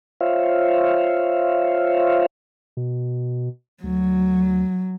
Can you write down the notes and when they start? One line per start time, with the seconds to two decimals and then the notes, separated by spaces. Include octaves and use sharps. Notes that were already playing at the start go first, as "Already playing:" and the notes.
0.21 F4 C5 C#5 E5 F5
2.77 B2
3.84 D2 F#3